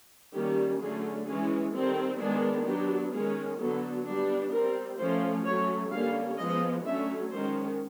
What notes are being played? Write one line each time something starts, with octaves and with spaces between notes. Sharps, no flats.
D#3 G3 A#3 C#4 G4
D3 F#3 A3 C#4 G#4
E3 G#3 C#4 G#4
D#3 G3 C4 A4
D#3 G#3 B3 D4 G#4
F#3 B3 D4 G4
D#3 G#3 C#4 G#4
D3 F#3 B3 A4
G3 B3 D4
G3 C4 A#4
F3 A3 C#4 C5
F#3 A3 C#4 C#5
D3 G3 A#3 C#4 F5
F3 G#3 B3 D#5
D3 F#3 A3 C#4 E5
D#3 G#3 C#4 C5